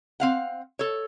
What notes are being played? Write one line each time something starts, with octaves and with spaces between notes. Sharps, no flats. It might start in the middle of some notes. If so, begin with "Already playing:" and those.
C4 F5 F#5
A4 C#5